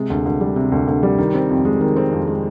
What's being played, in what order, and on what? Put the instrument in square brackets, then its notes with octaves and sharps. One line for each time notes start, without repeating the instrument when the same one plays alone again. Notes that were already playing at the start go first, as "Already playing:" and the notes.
Already playing: [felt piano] C3 G#3
D2
D2
G3
C3
D2
D2
G3
D#3
C4
F2
G#3
D#3
C4
F2
G#3